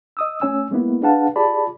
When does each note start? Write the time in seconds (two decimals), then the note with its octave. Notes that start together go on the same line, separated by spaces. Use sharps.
0.17 D#5 D#6 E6
0.41 A3 C#4 C#5 G#5 E6
0.71 G#3 A#3 B3 E4
1.02 D4 G#4 B4 F5 F#5 A5
1.36 F4 G4 G#4 D5 A5 B5